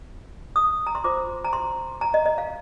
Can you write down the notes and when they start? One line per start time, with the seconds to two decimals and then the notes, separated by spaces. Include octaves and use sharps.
0.56 D#6
0.87 A#5
0.95 C6
1.04 F4 C5 D6
1.45 A#5
1.53 C6
2.01 A#5
2.14 D#5
2.26 D#5
2.38 F5